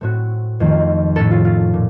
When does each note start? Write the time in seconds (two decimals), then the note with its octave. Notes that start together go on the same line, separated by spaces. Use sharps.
0.01 A2 A3 C4 F#4
0.60 F2 D#3 A3 C4
1.16 A2 A3 C#4 A4
1.31 F4
1.45 F4
1.74 A#2